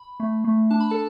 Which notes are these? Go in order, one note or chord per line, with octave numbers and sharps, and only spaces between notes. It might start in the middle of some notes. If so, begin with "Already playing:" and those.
Already playing: B5
A3
A3
D4 A5
B5
A4 A5